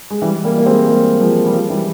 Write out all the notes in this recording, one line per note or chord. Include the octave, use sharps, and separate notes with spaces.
G#3
E3 G3
G3 A#3
A#3
G#3 C4
G3 A#3
F3 G#3
G3
F3 G#3
E3 G3